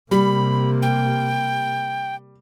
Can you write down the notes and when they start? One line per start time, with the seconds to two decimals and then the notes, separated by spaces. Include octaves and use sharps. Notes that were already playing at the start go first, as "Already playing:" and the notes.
0.11 C3 G3 A#3 B5
0.82 G5